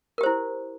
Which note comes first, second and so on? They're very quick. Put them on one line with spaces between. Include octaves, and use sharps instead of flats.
A#4 G4 C5 E4